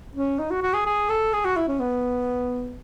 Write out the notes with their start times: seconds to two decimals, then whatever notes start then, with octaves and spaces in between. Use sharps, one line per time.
0.15 C#4
0.39 D#4
0.50 F#4
0.62 F#4
0.73 G#4
0.86 G#4
1.09 A4
1.33 G#4
1.45 F#4
1.56 E4
1.68 C#4
1.79 B3